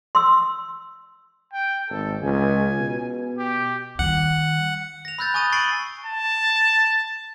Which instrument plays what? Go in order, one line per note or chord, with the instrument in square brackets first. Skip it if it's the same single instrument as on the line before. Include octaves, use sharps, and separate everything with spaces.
[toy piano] C6 E6
[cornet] G5
[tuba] G#1 [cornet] A4
[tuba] C#2 [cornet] G#5
[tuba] B2
[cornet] G4
[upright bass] D#3 G3 [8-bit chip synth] F#5
[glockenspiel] A#6 F7
B5 E6 F#6 G6 A6
G#5 C#6 D#6 A6 D#7 G7
C#6 A6 C7 D7 F#7 G7
[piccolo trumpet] A5